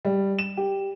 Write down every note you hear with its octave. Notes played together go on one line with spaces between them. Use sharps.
G3
E7
G4